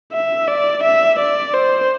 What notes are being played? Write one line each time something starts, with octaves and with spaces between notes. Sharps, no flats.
E5
D5
E5
D5
C5